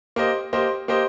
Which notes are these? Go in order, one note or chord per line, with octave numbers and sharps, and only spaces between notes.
A#3 G4 C5 D#5
A#3 G4 C5 D#5
A#3 G4 C5 D#5